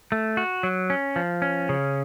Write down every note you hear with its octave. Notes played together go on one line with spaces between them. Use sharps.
A3
F#4
F#3
C#4
F3
C#4
C#3